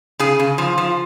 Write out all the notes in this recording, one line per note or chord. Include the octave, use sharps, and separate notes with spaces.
C#3 G#4
C#3
F3
F3